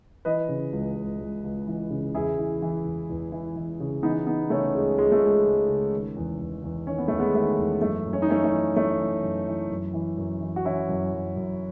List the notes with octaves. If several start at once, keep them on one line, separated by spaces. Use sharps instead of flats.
E3 B4 D#5
C#3
C#2
C#2
C#2
C#2
E3
C#3
E2 E4 G#4
E3
E3
E2
E2
E3
E3
C#3
E3 B3 D#4
E3 B3 D#4
C#3 A3 C#4
C#2 G#3
C#2 G#3
A3
C#2 G#3
C#2
C#3
D#3
E2
E2
E2
D#3 C#4
B3
E2 A3
G#3 B3
D#3 A3
E2
F#2 A3
F#2
C#4
D#4
E3 A3 C#4
A3
E3
E3 A3 C#4
E3
F#2
E3
F#2
E3
F#2
E3
F#4
E3 C#4 E4
F#2
F#2
F#2